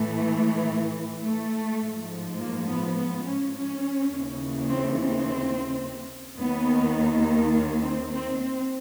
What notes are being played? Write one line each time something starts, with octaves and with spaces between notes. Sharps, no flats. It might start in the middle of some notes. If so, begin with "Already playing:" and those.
Already playing: A2 E3 A3
A3
G#2 F3
A#3
B3
B3
C#4
C#4
D#2 C#3 E3
C4
C4
D#2 D#3 B3
A#3
C4
C4
C4